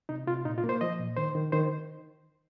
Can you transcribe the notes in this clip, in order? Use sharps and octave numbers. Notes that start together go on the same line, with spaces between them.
C3 D#4
C3 F4
A#2 D#4
F4
A#3
C5
F3 D#5
A#2
D#3 C5
D#3
D#3 C5